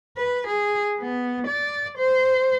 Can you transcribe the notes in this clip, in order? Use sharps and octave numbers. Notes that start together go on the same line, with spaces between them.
B4
G#4
B3
D5
C5